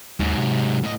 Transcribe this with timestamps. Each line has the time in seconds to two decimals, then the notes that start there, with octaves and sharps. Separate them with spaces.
0.20 D#2 G#2 F#3
0.38 C3
0.83 A2 D#5